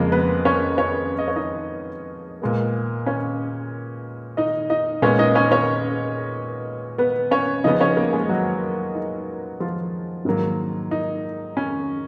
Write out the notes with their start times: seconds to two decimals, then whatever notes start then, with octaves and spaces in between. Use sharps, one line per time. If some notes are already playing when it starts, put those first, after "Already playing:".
Already playing: F2 C#3 F3 G#3 A#3 A#4
0.12 B3 B4
0.45 C#4 C#5
0.78 C#4 C#5
1.18 D#5
1.28 C#5
1.36 D#4 D#5
2.42 A#2 G#3 B3
3.06 C#4 C#5
4.37 D#4 D#5
4.70 D#4 D#5
5.02 A#2 G#3 B3 C#4 C#5
5.19 D#4 D#5
5.35 C#4 C#5
5.51 C#4 C#5
6.98 B3 B4
7.31 C#4 C#5
7.64 C#3 F3 B3 D#4 D#5
7.81 C#4 C#5
7.97 A#3 A#4
8.13 G#3 G#4
8.29 F#3 F#4
8.95 D#4
9.60 F3 F4
10.25 G#2 D#3 F#3 A#3
10.91 D#4
11.57 C#4